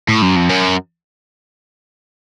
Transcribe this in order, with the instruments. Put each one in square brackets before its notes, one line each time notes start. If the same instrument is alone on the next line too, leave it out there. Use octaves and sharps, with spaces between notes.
[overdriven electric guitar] A2
F#2
F2
F#2